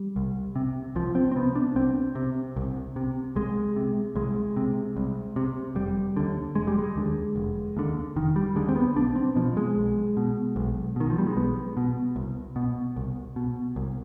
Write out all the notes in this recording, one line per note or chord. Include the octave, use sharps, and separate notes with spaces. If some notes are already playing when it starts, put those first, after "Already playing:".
Already playing: G3
C2
C3
C2 F3
C4
C4
C3 B3
D4
C2 C4
C3
C2
C3
C2 G#3
C3
C2 G#3
C3
C2
C3
F1 G3
D#2 D3
F1 G#3
G3
G#3
D#2 D3
F1
D#2 D3
F1 D#3
G3
D#2 D3 G#3
C4
B3
B1 D4
C4
B2 F3
G#3
B1
B2
B1
B2 D#3
F3
G3
G#3
B1 B3
B2
C2
B2
C2
B2
C2